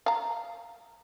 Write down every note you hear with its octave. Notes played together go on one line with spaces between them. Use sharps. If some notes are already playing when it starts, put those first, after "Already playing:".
F5 A#5